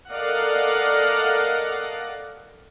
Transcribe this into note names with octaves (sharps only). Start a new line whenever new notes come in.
A4 A#4 D5 D#5 F5 F#5